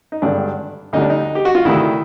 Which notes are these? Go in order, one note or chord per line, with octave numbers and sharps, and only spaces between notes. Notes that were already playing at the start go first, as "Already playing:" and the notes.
D#4
G#1 G2 D3 G3 D4
D2 D3 G3 D#4
D4
D#4
G4
F#4
F4
D2 C3 D#3 E4